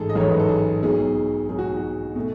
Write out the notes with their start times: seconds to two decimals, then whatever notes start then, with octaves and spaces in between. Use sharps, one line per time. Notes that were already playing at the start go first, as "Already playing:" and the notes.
Already playing: A1 G#2 A3 D#4 G#4 A4
0.10 D#5
0.15 A1 G#2 F#3 A3 D#4 C#5
0.29 B4
0.39 A4
0.49 G#4
0.82 B1 B2 G#3 D#4 G#4
1.49 B1 B2 G#3 D#4 G#4
1.59 F#4
1.77 F#4
2.15 B2 A3